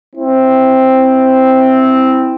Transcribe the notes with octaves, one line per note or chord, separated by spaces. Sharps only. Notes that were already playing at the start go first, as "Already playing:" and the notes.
C4 E4